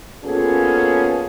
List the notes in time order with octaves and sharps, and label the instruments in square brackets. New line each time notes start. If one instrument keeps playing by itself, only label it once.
[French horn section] A#3 B3 C#4 F4 G#4 A4